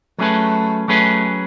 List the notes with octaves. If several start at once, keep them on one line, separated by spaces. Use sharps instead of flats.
F#3 A3 C#4 G#4 B4
F#3 A3 C#4 G#4 B4